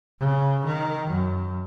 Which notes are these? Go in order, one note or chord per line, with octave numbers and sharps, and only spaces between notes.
C#3
D#3
F#2